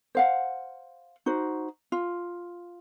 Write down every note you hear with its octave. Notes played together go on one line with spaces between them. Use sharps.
C5 F5 F#5
D#4 F#4 C5
F4